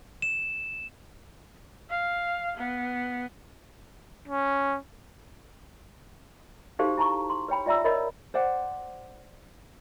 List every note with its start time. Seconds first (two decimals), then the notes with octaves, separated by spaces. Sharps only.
0.22 E7
1.90 F5
2.57 B3
4.28 C#4
6.79 D#4 F#4 G4 A4 C5 F5
6.97 E4 A5 A#5 C#6
7.30 C6
7.48 B4 C#5 G5 B5
7.66 F4 D5 E5 A#5 E6
7.84 A#4 C#5 D#5 B5
8.34 C5 D5 F#5